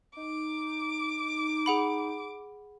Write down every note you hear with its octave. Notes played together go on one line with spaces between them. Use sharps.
D#4 D6
G#4 F#5 B5